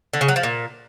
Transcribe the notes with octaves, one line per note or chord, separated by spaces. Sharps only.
D3
C#3
F#3
F3
A#2